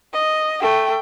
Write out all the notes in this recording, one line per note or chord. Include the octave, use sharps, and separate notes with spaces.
D#5
A3 G5